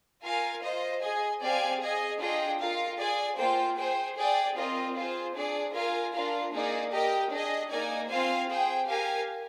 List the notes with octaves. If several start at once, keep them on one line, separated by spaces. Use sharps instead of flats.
F4 A#4 F5 G#5
F4 C5 D#5
G#4 D#5 G#5
C4 G4 D5 F5 G#5
G#4 D#5 G#5
D4 F4 G#4 D#5 G5
F4 A#4 F5
G#4 D5 G#5
A#3 F4 C5 G5
G#4 C5 G5
G#4 D5 G5
C4 F4 A#4 D#5
F4 G#4 C5
D4 G#4 D5
F4 A#4 F5 G#5
D4 F4 A#4 F5
A#3 D#4 G#4 D5
G4 A#4 D#5 G5
D4 G#4 D#5
A#3 D#4 A#4 D5 G#5
C4 F4 C5 F5 G#5
G#4 C5 G5
G4 A#4 F5 G#5